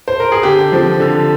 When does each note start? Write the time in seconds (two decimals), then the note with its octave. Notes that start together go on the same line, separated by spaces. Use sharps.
0.08 C5
0.20 A#4
0.32 G#4
0.43 D3 G4
0.72 F3 C4
1.00 D3